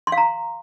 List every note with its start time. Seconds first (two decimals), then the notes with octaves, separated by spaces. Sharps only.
0.07 C6
0.12 F5
0.17 A#5